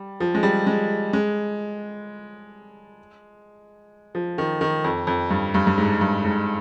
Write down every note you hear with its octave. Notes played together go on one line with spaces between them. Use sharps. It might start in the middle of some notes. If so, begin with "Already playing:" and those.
Already playing: G3
F3
G#3
G3
G#3
G#3
F3
D#3
D#3
F2
F2
G2
G2
G2
G#2
G2
G#2